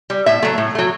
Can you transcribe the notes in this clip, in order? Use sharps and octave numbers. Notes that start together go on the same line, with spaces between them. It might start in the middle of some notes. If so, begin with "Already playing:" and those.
G3
A2 E5
F#3 A3
A2
F#3 A3